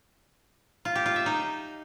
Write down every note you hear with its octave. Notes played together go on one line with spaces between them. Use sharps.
F4
G4
F4
E5
D#4